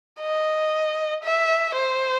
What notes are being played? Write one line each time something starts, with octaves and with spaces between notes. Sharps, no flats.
D#5
E5
C5